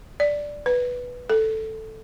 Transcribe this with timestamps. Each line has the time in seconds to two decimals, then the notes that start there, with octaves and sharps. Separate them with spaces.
0.20 D5
0.66 B4
1.30 A4